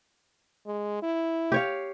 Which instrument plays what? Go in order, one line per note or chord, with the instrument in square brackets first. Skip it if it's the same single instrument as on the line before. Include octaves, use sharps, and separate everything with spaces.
[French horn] G#3
E4
[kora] G4 C#5 F5